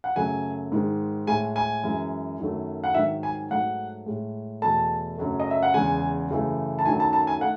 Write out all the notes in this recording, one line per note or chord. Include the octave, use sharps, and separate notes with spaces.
F#5
F#2 C#3 F#3 A3 G#5
G#2 D#3 G#3
A2 G#3 G#5
G#5
F#2 E3 G#3
F#2 D#3 F#3 A3
F#5
G#2 D#3 F#3 E5
G#5
G#2 F#3 A3 F#5
A2 G#3
E2 B2 A3 A5
F#2 C#3 F#3 A3
D#5
E5
F#5
E2 C#3 G#3 G#5
F#2 C#3 E3 A3
A5
F#2 D#3 F#3 A3 G#5
A5
A5
G#5
A3 F#5